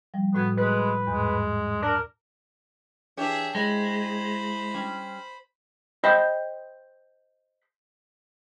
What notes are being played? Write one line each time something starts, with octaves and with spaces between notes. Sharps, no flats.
F3 G3
A2 B3 F#4 G#6
G#3 B4
E2 G#2 G#3
D4 A#4
E3 D4 G4 G#4 C#5 E5
G#3 E4 C5 B5
G3 C#4
C5 D#5 G5 B5